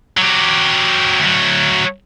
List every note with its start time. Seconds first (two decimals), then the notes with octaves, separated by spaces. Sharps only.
0.17 F#3 G4
1.20 D2 F#3